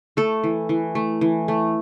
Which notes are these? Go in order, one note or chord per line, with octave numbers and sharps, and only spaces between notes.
A3 A4
E3
E3
A3
E3
A3